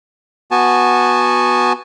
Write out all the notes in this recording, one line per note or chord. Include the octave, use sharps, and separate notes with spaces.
B3 F#4 G#5 A5